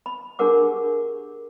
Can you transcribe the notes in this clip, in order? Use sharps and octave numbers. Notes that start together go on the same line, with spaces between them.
B5
D4 G4 G#4 A#4 F#5 D6